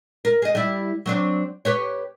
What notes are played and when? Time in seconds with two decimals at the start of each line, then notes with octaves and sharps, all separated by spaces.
0.25 A#4
0.42 G#4 D#5
0.55 G3 E4
1.06 F#3 C4 D4
1.65 G4 B4 C#5